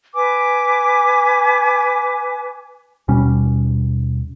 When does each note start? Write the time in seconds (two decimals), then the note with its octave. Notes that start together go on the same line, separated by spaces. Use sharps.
0.15 B4 G#5 D6
3.08 D#2 B2 G3 C#4